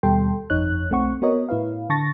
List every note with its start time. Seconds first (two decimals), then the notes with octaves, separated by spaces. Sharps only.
0.03 D#2 B2 G3 A4 G5 C6
0.50 G1 F2 D#4 C#5 F#6
0.90 B1 A3 C4 F#5 C#6
1.22 B3 F#4 A#4 C#5 D#5
1.49 A2 E4 B4 F5
1.89 D3 A5 C#6 A6 A#6